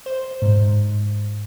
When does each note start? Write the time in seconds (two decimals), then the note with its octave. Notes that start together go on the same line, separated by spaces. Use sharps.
0.06 C5
0.42 G#2